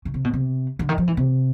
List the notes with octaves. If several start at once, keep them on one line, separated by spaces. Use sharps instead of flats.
C#3
C3
B2
C3
D3
D#3
F3
E3
C3